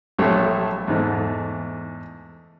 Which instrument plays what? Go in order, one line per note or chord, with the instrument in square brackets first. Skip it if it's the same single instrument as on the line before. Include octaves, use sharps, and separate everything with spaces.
[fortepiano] A#1 A#2 F#3 G3 A3 C#5
E2 G#2 A3